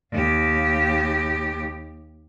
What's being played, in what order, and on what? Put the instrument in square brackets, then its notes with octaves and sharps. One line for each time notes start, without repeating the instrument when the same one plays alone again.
[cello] D#2 G4